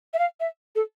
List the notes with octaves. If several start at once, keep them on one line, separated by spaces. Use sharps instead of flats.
E5
F5
E5
A4